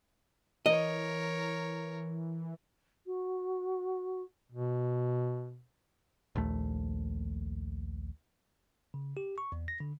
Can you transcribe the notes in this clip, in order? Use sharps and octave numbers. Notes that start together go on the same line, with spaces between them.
E3 A#4 C#5 D#5
F#4
B2
A#1 D#2 A3
C#3
G4
C#6
E2
A#6
D3